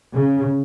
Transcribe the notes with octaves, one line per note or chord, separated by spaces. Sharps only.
C#3